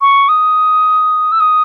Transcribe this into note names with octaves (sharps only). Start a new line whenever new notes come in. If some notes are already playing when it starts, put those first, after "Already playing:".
C#6
D#6
E6
D#6